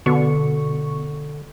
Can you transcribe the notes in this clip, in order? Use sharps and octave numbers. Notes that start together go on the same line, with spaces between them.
B2 D3 C#6